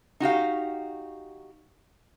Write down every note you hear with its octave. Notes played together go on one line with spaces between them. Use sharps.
D#4 F#4 G4 F5